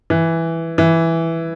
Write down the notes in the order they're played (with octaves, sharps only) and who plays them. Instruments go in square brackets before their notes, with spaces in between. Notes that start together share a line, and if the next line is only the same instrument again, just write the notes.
[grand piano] E3
E3